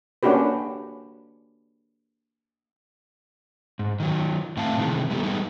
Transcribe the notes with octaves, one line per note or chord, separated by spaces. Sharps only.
A#3 C#4 D4 F#4 G4 B4
G#2
D#3 F#3
A2 C4 F5 A5
C3 D#3 E3 G#3
G#3 A3 B3 G4 A4
G3 G#3 B3 D#4